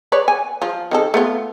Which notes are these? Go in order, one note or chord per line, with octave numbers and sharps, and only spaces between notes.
B4 C#5 D5
G#5
F3 F4
D#3 C4 A4
A3 B3 F4